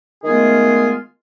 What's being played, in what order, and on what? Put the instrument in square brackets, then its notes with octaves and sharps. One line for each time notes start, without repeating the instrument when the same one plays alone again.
[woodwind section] D#3 G#3 A3 B3 F4 G#4